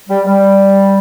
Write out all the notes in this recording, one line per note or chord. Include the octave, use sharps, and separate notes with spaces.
G3
G3